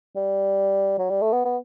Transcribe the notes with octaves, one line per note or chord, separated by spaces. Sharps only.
G3
F#3
G3
A3
B3
B3